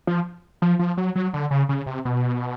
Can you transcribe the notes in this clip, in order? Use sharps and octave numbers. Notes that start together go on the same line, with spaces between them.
F3
F3
F3
F#3
F#3
D3
C#3
C#3
C3
B2